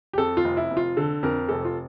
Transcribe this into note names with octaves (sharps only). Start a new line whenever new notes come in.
G4
F2 A4
F4
F1
E4
F1
F4
D3 A4
F2 A#4
F1 A4
F4